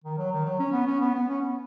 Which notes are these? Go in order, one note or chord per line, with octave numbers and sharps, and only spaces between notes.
D#3
F#3
D#3
F#3
C#4
B3
C#4
B3
B3
C#4
B3